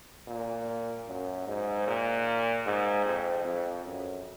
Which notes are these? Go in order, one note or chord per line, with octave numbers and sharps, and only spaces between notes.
A#2
F#2
G#2
A#2
G#2
F2
F2
F#2